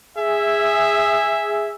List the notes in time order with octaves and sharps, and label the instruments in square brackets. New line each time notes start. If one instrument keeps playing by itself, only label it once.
[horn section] G#4 E5